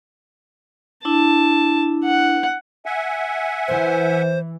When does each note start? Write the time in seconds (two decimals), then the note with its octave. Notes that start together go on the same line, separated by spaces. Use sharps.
1.05 D4 E4 A5
2.04 F#5
2.86 E5 F#5 G#5
3.68 E3 C5